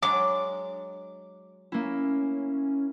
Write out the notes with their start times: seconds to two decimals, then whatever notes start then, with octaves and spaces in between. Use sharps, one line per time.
0.02 F#3 G#3 D4 D6
1.72 A#3 C#4 E4